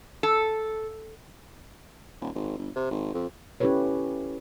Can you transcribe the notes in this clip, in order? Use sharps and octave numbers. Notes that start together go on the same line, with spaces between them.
A4
D#1
G#1
G1
C3
G#1
F2
C#4 E4 G4 A4 B4 C#5